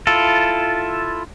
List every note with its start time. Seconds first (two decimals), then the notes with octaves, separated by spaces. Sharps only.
0.07 E4 F4 A4